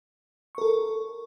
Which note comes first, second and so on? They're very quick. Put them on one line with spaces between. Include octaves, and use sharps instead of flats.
C#6 A#4 A4